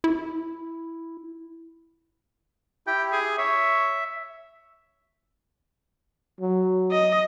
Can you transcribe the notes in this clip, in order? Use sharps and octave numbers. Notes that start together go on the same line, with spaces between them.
E4
E4 G4 G5
G#4
C#5 E5
F#3
D#5